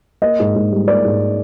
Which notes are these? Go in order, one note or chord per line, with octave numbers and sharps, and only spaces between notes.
A#3 D#5
G#2
G#2
G3
A#3 D5
G#2